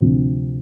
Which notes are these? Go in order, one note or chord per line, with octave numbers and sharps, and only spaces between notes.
D2 C3 F3 C4